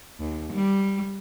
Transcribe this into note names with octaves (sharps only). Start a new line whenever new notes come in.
D#2
G3